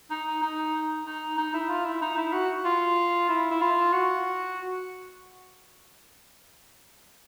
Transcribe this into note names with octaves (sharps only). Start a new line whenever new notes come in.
D#4
D#4
D#4
D#4
E4
F4
E4
D#4
E4
F#4
F4
E4
E4
F4
F#4